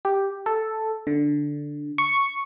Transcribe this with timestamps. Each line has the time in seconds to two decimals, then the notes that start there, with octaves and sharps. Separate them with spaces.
0.05 G4
0.46 A4
1.07 D3
1.98 C#6